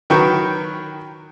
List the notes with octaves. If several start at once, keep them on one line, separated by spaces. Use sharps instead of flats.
D#3 F#3 B4 G5 C#6